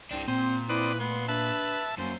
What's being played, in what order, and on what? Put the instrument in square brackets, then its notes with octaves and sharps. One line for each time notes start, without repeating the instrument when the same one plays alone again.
[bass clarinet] C2 [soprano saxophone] C4 [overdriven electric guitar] D4 G4
[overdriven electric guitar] A#2 [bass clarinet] C4 [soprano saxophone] C5
[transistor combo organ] C4 D5 D#6 [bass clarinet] E4 [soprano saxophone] B4
[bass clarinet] A3 [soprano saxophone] B3 [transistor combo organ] C6
[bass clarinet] D4 [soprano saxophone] B4 [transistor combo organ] E5 A5
[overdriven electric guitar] F#2 [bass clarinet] A#3 [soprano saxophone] C5